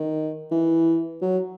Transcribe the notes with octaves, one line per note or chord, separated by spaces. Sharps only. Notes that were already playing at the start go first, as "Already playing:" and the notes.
Already playing: D#3
E3
F#3